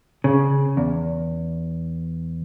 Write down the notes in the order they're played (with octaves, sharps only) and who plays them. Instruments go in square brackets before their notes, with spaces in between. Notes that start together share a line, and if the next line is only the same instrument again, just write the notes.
[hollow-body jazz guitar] C#3
E2